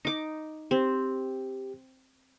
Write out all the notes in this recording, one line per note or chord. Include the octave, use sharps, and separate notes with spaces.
D#4 D6
C4 G4